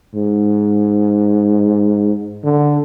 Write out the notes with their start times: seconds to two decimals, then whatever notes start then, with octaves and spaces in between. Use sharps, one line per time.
0.15 G#2
2.44 D3